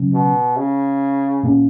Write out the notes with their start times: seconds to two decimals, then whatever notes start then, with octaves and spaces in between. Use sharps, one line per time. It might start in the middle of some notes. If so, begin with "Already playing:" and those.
Already playing: C#3 F#3 C#4
0.13 B2
0.56 C#3
1.43 A#2 A#3 C#4